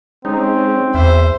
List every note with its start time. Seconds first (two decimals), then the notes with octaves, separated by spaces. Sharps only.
0.25 G#3 C4 C#4 D#4
0.94 E2 C5 E5